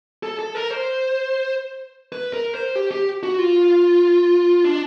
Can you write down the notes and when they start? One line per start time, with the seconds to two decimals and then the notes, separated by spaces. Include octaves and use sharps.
0.23 A4
0.39 A4
0.55 A#4
0.70 C5
2.12 B4
2.33 A#4
2.55 C5
2.75 G4
2.91 G4
3.23 F#4
3.38 F4
4.64 D4